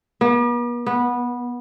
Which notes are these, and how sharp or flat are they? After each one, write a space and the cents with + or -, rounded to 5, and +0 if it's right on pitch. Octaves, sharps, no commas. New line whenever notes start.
B3 -45
B3 -15